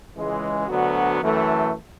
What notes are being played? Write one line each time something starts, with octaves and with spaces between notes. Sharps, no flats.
C#2 C#3 E3 G#3
D2 D3 F#3 B3 F#4
F#2 E3 A3